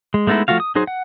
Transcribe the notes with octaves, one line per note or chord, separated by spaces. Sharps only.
G#3
G#3 A3 B3 D#4 E4
F3 A3 F4 F#4 F5
D#6
F#3 D#4 G#4 C5
F#5